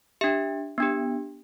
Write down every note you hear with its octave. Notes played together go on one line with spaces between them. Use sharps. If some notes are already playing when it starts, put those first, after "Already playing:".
D4 G4 E5
B3 D4 G4